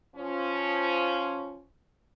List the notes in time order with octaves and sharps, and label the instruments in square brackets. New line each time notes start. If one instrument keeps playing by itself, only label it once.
[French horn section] F3 C#4